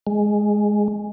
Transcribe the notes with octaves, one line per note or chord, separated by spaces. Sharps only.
G#3